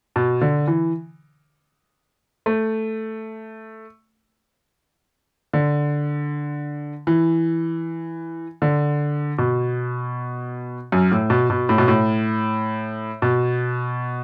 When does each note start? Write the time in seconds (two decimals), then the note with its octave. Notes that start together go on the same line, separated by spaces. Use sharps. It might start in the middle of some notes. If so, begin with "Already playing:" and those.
0.16 B2
0.41 D3
0.67 E3
2.46 A3
5.53 D3
7.07 E3
8.62 D3
9.38 B2
10.92 F#2
11.12 A2
11.30 B2
11.50 B2
11.69 A2
11.78 B2
11.88 A2
13.22 B2